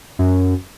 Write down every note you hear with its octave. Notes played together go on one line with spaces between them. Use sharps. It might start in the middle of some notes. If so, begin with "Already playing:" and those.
F#2